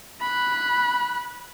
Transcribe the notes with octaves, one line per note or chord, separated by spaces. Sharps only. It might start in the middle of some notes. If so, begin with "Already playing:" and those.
B5 F#6